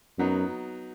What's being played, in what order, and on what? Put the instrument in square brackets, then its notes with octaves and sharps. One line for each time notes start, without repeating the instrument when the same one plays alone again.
[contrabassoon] F#2 [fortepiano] F#3 B3 D#4